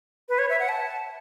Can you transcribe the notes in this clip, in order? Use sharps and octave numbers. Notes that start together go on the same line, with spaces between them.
B4
C#5
E5
F#5
A5